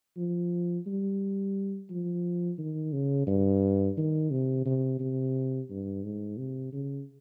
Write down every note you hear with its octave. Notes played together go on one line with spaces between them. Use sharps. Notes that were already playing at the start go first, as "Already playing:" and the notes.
F3
G3
F3
D#3
C#3
G2
D#3
C3
C3
C3
G2
G#2
C3
C#3